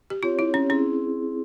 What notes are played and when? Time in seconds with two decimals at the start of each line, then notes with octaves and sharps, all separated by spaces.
0.10 G4
0.23 C4 F4 G4 C#5
0.39 E4
0.54 C#4
0.70 C4 C#4 E4 G#4